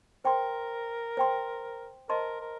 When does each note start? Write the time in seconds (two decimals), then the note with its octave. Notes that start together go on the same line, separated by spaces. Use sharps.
0.25 A#4 C5 G5 C6
1.17 C5 G5 C6
2.09 A#4 C5 D#5 A5 C6
2.40 A#4